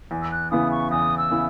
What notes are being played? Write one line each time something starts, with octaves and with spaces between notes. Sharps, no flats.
E2
E6
F#6
C#3 E3 B3 E4 D#6
C#6
E2 D#6
E6
C#3 E3 B3 E4